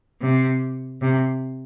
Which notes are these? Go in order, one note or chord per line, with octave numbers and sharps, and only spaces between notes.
C3
C3